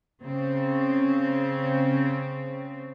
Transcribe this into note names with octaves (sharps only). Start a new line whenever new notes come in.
C#3 C4